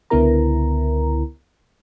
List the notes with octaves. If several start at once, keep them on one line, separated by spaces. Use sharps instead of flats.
C#2 D3 B3 E4 A#4 A#5